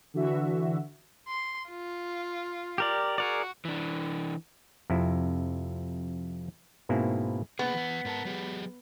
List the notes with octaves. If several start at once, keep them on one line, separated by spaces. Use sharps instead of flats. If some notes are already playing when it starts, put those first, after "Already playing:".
D3 E3 F#4 E5
C6
F4
G4 A#4 D5
F#4 G#4 A#4 D5
E3 D4
F2 C3 E4
G#2 B2 A#3 C4 E4
C3 A#3 B3 G#4
E3 F#5
G#2 A#4 A5
F#3 G4 G#4